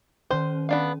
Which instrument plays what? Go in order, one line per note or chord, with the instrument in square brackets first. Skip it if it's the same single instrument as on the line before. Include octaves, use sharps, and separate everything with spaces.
[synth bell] D#3 C#4 [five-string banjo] C5
[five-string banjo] B3 D4 F5